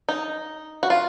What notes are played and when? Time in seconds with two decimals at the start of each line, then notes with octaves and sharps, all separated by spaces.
0.09 D#4
0.83 F#4
0.90 F4